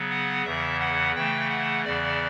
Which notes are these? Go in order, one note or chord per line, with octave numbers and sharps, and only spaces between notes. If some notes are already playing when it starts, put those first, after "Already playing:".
Already playing: C#3 F#3 B3
F#5
E2 C#3 E3 E5
F#5
C#3 E3 A3 G5
F#5
E2 C#3 E3 D5